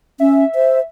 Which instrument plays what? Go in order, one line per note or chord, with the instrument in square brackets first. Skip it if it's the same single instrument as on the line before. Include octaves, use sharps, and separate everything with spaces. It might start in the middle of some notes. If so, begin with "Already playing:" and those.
[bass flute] C#4 [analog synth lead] E5
[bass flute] C5